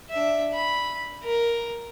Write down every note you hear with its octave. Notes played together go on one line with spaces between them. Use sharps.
D4 E5
B5
A#4